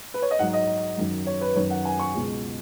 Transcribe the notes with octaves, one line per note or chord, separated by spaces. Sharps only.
B4
C#5
D#5
G#2 F#3 F#5
D#5
F#2 D#3 F#3
C#5
B4
F#2 D#3 F#3 C#5
F#5
G#5
C#6
C#2 B2 G#3